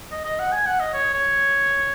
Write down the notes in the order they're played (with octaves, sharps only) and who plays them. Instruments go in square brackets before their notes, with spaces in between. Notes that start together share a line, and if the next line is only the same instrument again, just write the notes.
[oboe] D#5
D#5
F#5
G#5
F#5
D#5
C#5
C#5